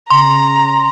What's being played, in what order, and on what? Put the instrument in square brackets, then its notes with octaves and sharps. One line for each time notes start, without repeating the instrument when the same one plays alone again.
[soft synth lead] C#3 [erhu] A#5 [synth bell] C6